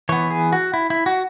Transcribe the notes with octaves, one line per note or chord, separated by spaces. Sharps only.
E3 B3 C#5
G#4
F#4
E4
E4
F#4